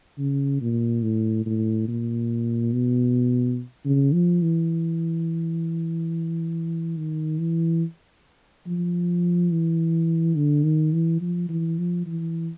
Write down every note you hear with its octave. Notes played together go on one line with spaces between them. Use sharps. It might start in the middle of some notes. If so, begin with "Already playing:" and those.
C#3
A#2
A2
A2
A#2
B2
C#3
F3
E3
D#3
E3
F3
E3
D3
D#3
E3
F3
E3
F3
E3